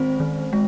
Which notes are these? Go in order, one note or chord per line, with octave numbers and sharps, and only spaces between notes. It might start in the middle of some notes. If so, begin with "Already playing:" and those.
Already playing: D#3 G#3 C4 C5
D#3
G#3